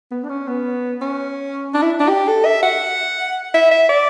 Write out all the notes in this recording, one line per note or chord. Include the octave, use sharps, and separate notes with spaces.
B3
D4
C#4
B3
C#4
D4
E4
D4
G4
A4
E5
F#5
E5
E5
D5